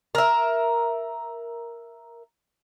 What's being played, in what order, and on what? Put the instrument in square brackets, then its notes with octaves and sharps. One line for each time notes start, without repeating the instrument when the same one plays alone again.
[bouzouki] A#4 E5